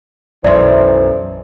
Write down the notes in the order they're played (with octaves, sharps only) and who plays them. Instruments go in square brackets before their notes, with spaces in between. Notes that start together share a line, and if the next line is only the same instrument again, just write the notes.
[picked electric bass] B1 F#2 [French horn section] E3 A4 C5 [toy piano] D5 E5 C6